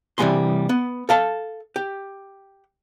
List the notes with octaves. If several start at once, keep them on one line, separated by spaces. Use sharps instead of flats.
C3 E3 G3 G#3 G#5 C6
B3
A4 F5 A5
G4